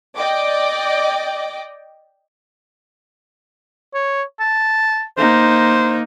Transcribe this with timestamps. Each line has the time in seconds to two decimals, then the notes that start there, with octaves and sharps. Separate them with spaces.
0.16 D5 D#5 G5 D6
3.94 C#5
4.40 A5
5.17 A#3 D#4 C5